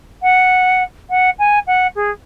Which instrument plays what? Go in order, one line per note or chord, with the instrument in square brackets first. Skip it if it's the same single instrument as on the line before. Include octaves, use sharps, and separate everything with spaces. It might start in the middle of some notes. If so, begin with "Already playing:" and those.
[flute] F#5
F#5
G#5
F#5
G#4